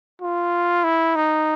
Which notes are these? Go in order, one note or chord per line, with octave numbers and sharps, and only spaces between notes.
F4
E4
D#4